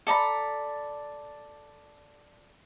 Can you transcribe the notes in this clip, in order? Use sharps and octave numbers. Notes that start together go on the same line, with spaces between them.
A4 D5 A#5 B5